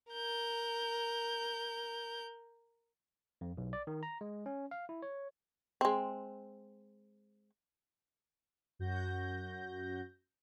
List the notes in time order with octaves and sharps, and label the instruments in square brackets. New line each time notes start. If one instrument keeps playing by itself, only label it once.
[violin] A#4 G6
[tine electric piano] F2
B1
D5
D#3
A#5
G#3
C#4
F5
E4
C#5
[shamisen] G#3 C4
[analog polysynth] F#2 F#4 G6 A#6